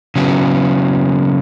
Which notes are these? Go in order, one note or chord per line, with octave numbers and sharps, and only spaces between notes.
C#3 F#3 B3